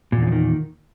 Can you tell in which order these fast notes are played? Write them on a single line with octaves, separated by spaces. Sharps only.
A#2 E2 D3 F3 D#3